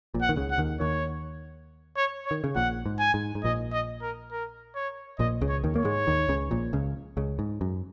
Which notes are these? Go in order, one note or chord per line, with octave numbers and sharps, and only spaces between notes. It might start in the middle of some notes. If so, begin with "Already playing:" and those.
A#1 A#2
F#5
D#3
C#2 C#3
F#5
D#2 D#3
D#2 D#3 C#5
C#5
C#5
D#3
C#3
A#1 A#2 F#5
G#2
G#5
G#2
G#2
A#1 A#2 D#5
D#5
A#4
A#4
C#5
A#1 A#2 D#5
C#2 C#3
C#5
D#2 D#3
A#3 C#5
G#2 G#3
D#2 D#3
C#2 C#3
A#1 A#2
C#2 C#3
C#2 C#3
G#2
F#2